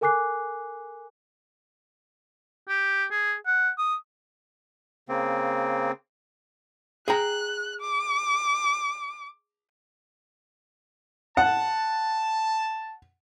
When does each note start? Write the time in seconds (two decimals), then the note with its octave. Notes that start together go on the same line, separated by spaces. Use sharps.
0.01 A4 A#4 G#5 D6 F#6 C7
2.69 G4
3.11 G#4
3.47 F#5
3.78 D#6
5.09 C#3 A#3 C4
7.08 G#4 G5 A#5 F#6
7.81 D6
11.37 F#5 A5